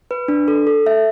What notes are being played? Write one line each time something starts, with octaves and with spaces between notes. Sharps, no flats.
B4
D4
A4
A4
E5